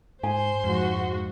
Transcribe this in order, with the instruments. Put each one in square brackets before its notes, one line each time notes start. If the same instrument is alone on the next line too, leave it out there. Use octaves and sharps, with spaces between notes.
[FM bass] G#2 [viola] C5 C6 [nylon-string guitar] G#5
[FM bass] F2 [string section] G#2 F3 F#4